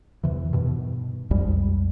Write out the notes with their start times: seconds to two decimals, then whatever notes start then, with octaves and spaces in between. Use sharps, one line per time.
0.24 E2 C3 E3
0.53 G2 B2 D#3
1.30 B1 F2 G3 G#3